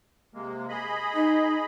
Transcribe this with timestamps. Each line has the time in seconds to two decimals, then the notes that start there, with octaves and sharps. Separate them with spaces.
0.34 C3 G#3 A#3
0.69 G#4 D#5 B5
1.13 D#4